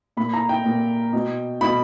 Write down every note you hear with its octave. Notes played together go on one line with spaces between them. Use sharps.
A#2 B5
A#5
G5
A#2
B2
B2 B5